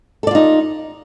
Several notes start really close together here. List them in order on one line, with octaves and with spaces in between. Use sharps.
A4 D5 F4 D#4